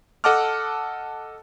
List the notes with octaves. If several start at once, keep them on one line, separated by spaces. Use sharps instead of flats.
A4 D#5 F#5 A5 D6 F6